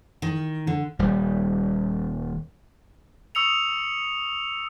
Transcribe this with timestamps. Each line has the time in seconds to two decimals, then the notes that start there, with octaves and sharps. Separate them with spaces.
0.22 D#3
0.67 D3
0.99 D#1 G3
3.35 C#6 D#6 E6 C#7 F7